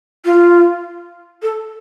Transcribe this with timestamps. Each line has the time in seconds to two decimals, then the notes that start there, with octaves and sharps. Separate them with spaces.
0.25 F4
1.42 A4